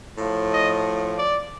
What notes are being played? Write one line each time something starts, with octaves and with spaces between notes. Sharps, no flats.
A2 F3
D#5
D5